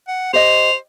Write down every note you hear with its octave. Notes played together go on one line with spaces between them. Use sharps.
F#5
G4 C5 D#5 F7